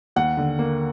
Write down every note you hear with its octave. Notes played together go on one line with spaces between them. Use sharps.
D#2 F#5
D3
A#3